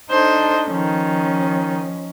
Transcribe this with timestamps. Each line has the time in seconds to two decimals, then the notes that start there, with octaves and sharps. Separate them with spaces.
0.11 D4 D#4 A4 C5
0.72 D#3 F3 C#4